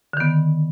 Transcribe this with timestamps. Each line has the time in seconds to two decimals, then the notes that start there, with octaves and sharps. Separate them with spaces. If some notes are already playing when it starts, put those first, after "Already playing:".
0.13 D3
0.17 D#3
0.20 B3